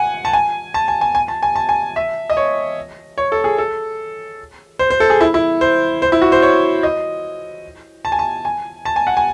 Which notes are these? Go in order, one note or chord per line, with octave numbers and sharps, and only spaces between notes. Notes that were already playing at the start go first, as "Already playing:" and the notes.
Already playing: F#5 G#5
A5
G#5
A5
G#5
G#5
G#5
A5
G#5
A5
G#5
E5
D#5
C#5
C#5
A4
G#4
A4
C5
C5
A4
G#4
E4
E4
C5
C5
E4
F#4
C5
C#5
D#5
A5
G#5
A5
G#5
A5
G#5
F#5
G#5